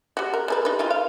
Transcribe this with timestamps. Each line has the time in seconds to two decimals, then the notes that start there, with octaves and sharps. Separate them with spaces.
0.17 G3 F#4
0.34 A#4
0.48 G3 G#4 B4
0.65 D#4 B4
0.79 D#3 E3 F4
0.90 F5